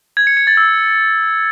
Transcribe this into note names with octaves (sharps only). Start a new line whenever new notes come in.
G#6
C#7
C#7
A6
E6